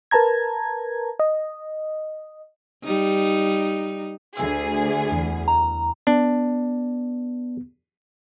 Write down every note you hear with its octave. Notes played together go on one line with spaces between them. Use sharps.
A#4 B4 A5 A#5 G#6
D#5
G3 D#4
D2 G#4 E6
E2
A#5
B3 D4